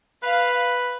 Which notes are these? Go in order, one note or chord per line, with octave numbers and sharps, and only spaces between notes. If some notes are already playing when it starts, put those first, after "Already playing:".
B4 F5